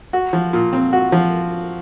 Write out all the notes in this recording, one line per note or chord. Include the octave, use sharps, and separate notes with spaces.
F#4
F3
A#2
C4
F#4
F3